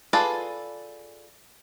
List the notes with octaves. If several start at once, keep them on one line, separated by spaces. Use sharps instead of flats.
F4 G#4 A4 B4 D5